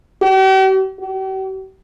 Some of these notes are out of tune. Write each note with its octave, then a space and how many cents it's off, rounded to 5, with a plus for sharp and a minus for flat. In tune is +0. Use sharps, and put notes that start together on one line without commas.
G4 -45
G4 -45